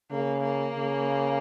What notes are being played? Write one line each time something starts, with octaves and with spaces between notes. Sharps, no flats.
C#3 A#3
A#3
C#3